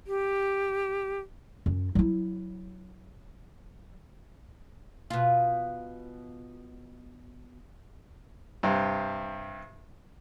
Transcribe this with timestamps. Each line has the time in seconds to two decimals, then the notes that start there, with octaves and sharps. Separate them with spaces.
0.07 G4
1.66 F#2
1.95 F#3 E4
5.10 B2 F4
8.63 G2 C3